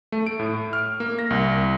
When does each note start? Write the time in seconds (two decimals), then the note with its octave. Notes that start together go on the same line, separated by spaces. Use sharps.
0.12 A3
0.27 D7
0.39 A2
0.73 F6
1.00 A#3
1.19 A#6
1.30 C2